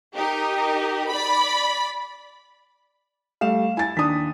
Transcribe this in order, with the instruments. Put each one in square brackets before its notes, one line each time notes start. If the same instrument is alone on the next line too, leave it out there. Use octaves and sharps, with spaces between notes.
[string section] D#4 G4 A#4
D5 B5
[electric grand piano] G3 A3 E7 [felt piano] F5
[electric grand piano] E4 [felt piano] G#5 A6
[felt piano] D#2 D#6 [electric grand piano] D4 B6